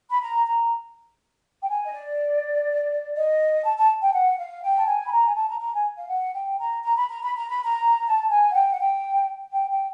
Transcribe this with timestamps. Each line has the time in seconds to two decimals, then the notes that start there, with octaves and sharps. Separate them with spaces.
0.09 B5
0.21 A#5
0.46 A#5
1.62 G5
1.69 G#5
1.87 D#5
1.92 D5
3.16 D#5
3.64 A5
3.77 A5
4.01 G5
4.13 F#5
4.39 F5
4.63 G5
4.77 A5
4.87 G#5
5.05 B5
5.12 A#5
5.23 G#5
5.36 A5
5.49 A#5
5.60 A#5
5.73 G#5
5.97 F5
6.09 F#5
6.34 G5
6.59 A#5
6.83 A#5
6.96 B5
7.09 A#5
7.24 B5
7.37 A#5
7.49 B5
7.63 A#5
8.06 A5
8.30 G#5
8.50 F#5
8.55 G5
8.72 F#5
8.79 G5
9.53 G5
9.70 G5